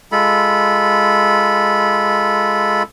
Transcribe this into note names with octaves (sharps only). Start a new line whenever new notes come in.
G#3 F4 A4 B5